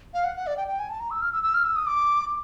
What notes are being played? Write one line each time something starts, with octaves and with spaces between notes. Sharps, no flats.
F5
F#5
F#5
D5
G5
G5
G#5
A5
A#5
E6
F6
E6
E6
F6
E6
D#6
D6